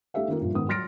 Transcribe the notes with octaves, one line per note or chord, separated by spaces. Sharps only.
A3 D#4 G4 A4 E5 F5
D#3 A#3 D#4 F4 A#4
G2 A#2 F3
G#2 D#3 B3 D#6
F#3 C6 F6 A6 A#6 D7